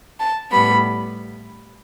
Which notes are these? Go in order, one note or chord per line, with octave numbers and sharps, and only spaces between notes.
A5
A2 G3 B3 B5